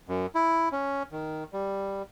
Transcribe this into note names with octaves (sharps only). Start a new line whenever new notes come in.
F#2
E4
C#4
D#3
G3